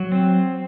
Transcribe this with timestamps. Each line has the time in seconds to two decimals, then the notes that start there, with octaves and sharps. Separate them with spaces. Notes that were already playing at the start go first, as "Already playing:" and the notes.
Already playing: F#3
0.12 C4